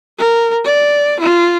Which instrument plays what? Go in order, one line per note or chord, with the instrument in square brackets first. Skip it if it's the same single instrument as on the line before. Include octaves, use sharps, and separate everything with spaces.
[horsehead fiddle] A#4
D5
F4